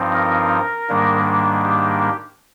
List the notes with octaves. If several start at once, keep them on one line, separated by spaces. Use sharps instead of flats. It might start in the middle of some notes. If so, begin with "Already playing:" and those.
Already playing: G2 F3 C4 D#4
A#4
G#2 D#3 G3 A#3 D4
G4